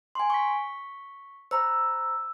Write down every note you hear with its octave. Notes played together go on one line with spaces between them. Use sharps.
G#5 C6
C#6 B6
C5 A#5 B5 E6